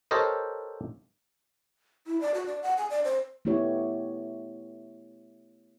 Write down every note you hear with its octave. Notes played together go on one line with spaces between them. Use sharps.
G4 A4 A#4 C5 C#5 D#5
E4
D5
F#4
D5
F#5
G#5
D5
C5
A3 B3 E4 G4 C#5